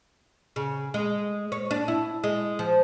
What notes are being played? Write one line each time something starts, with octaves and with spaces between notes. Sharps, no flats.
C#3
G#3
C#5
D4
E4
G#3
F3